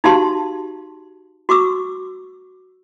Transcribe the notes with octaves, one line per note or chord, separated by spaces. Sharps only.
D#4 F#4 G4 F5 A5 C6
F#4 C#6 D6 E6